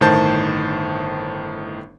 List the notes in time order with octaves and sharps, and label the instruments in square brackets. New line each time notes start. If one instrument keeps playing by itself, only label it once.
[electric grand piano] G1 A2 D#3 C5 A5 G6